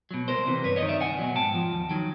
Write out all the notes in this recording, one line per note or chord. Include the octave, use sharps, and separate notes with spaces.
B2 F#3
C2 A#4 C5
C3 E3
G2 B4 C#5
C#5 D#5
D#3 F#3
D5 E5
C2 F#5 G#5
B2 F#3
G#2 G5 A5
F3
D#2
D#3 F#3